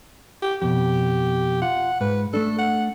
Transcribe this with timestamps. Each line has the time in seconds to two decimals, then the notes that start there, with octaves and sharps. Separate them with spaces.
0.42 G4
0.62 F2 B2 G4
1.62 F4 F#5
2.01 G#2 B4
2.34 A3 D4 A4
2.59 F#5